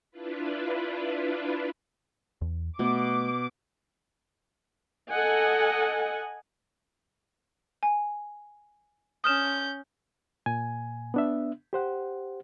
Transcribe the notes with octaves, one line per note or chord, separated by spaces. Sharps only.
D4 E4 F4 B4
E2
B2 A3 D6
A4 D#5 F#5 G#5
G#5
C#4 D#6 F6 G6 E7
A#2 G#5
B3 D4 E5
G4 C5 F#5